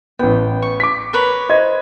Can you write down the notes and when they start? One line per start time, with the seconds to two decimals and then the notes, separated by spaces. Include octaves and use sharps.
0.19 A1 B3 G5
0.62 C#6
0.80 D6 B6
1.13 A#4 B4 C#5
1.49 C5 D#5 G#6